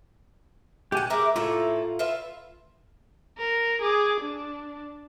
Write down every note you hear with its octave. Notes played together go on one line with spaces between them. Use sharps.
A#2 G4 F#5 G#5
G#3 E4 A#4 D6
A2 A#3 E4 F4 A4
F4 B4 E5
A#4
G#4 D6
D4